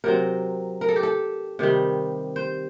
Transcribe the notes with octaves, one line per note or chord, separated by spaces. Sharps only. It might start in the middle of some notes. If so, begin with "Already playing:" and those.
C3 F#3 C4 A#4
A#4
A4
G4
A4
C3 D#3 G3
C5